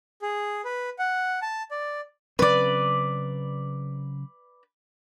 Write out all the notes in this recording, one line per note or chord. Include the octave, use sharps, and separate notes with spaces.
G#4
B4
F#5
A5
D5
C#3 F#3 C4 B4 D5